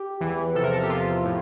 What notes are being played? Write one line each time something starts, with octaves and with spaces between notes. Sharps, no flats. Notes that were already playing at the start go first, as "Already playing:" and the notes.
Already playing: G4
E2 E3
E2 C3 F3 A4
A#4
A4
G4
E2 C3 F3 F4
A2